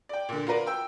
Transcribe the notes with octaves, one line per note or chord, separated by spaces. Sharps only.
D5 G5
A#2 D3
F4 F#4 A#4 B4 D5
G5 E6